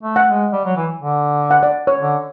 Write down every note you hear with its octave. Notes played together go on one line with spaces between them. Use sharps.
A3
F#5
G#3
G3
F#3
E3
D3
F#5
D5
C#5
D3